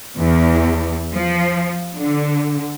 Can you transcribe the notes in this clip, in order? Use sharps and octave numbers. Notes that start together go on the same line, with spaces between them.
E2
F3
D3